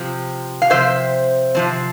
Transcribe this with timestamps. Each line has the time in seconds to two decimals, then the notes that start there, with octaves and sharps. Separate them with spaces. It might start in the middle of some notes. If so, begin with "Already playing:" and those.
Already playing: C3 F3 C4
0.62 F5
0.70 C3 F3 C4 C5 E5
1.55 C3 F3 C4